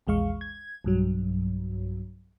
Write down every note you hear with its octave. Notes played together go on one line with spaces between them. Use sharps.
A#1 E2 G#3 F5 C#6
G#6
B1 G2 F#3